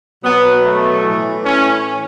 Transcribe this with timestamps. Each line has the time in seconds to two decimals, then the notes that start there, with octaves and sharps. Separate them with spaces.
0.24 B2 F#3 B3
0.64 A3
1.03 A2 E3
1.44 C#4